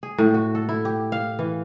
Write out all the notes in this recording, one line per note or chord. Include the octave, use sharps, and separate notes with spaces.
G#4
A2
F#4
A4
E4
G4
F5
E3